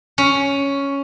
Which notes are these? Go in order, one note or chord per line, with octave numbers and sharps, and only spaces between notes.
C#4